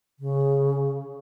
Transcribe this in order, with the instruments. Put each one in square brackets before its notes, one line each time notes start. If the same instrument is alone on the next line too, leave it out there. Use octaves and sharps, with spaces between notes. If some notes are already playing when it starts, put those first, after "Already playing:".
[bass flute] C#3